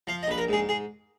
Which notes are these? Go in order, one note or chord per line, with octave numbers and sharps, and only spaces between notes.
F3 F5
D#5
A#1 B4
A#4
G#2 G#4
G#4